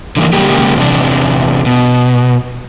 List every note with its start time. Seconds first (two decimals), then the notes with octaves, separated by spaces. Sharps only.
0.17 D3 E3 A#3
0.33 C#3 G3 G#3 A#3 G4
0.76 E2 C3 D4
1.66 B2